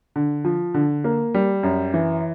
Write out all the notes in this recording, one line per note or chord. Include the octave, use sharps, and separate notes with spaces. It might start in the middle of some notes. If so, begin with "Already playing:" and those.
D3
F3
D3
A#3
G3
F#2
E3